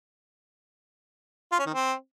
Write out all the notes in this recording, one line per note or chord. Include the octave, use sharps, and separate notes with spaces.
F4
C#4
D#3
C4